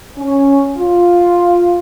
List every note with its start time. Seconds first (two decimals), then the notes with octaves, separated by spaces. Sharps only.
0.18 C#4
0.77 F4